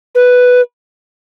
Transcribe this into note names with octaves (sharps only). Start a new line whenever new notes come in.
B4